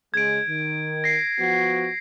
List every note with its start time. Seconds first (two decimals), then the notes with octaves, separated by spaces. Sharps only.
0.14 C#3 G#3 G#6 D7
0.48 D#3
1.04 A#6 C7
1.39 F3 B3 F#4